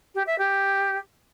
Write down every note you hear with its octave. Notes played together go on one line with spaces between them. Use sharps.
G4
E5
G4